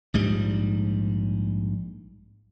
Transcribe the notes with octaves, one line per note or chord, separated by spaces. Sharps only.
A#1 G#2 G3